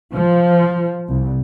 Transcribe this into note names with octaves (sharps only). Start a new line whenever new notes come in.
F3
C2